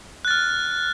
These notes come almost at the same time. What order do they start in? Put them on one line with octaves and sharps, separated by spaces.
F#6 A6 F6